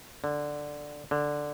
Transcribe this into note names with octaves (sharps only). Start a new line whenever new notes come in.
D3
D3